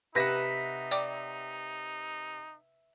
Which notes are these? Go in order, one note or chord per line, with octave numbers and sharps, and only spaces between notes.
C3 D#4 B4 E5 F#5 A#6
D5 G5 D6